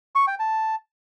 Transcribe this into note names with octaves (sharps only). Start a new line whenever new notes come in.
C#6
G5
A5